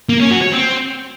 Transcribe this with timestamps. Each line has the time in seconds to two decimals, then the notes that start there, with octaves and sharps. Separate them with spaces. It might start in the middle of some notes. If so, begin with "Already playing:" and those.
0.09 A#3
0.20 C#4
0.31 F#4
0.41 C#5
0.52 C4